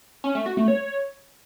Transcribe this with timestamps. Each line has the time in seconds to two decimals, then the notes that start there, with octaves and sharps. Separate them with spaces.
0.24 C#4
0.35 A3
0.46 F#4
0.57 A3
0.68 C#5